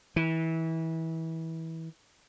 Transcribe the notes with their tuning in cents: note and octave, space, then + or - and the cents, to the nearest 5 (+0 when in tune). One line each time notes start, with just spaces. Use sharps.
E3 -25